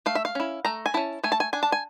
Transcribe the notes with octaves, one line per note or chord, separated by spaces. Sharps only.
A3 F5
E5
F5
C#4 E4
A3 A#5
G#5
C#4 E4 A5
A3 G#5
A5
G#5
D4 G#5
A5
G#5